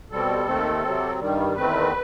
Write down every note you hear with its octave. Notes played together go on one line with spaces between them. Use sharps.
B2 G3 C4 A4
D#2 D#3 A3 C4
C3 F#3 C4
G2 D#3 G3
E2 D#3 A3 C4 B4